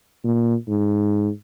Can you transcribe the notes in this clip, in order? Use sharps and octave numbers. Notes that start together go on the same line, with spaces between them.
A#2
G#2